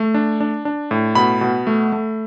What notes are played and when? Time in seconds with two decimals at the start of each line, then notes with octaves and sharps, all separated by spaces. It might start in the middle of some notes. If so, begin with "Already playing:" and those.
Already playing: A3
0.14 D4
0.40 D4
0.65 D4
0.91 A2
1.15 B2 B5
1.41 B2
1.67 A3
1.92 A3